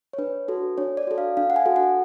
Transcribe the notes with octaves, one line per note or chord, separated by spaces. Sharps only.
C#5
D4 B4
F#4 A4
D4 C#5
D5
F#4 A4
F5
D4 F5
F#5
G#5
F#4 A4
F#5